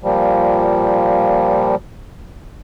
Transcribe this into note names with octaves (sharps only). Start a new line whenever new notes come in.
A#2 F3 G3